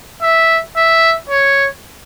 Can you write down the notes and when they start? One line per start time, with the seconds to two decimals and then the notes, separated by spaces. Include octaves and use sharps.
0.22 E5
0.76 E5
1.30 C#5